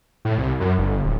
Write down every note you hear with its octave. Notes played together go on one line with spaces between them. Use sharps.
A2
C2
F#2
G1
D1